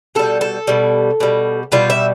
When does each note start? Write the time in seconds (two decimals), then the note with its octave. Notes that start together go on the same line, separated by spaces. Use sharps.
0.15 B2 G3 A4
0.41 A4
0.67 B2 G3
1.20 B2 G3
1.72 B2 G3 F4
1.90 E5